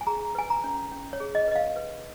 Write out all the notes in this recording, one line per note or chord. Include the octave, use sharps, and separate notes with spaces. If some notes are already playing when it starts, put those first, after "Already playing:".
G#5
G#4 A#5
B4 G#5
A#5
C#4
C#4
C#5
G#4
D#5
B4 D#5
F5
B4